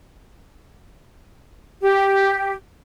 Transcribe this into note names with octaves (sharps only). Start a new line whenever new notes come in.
G4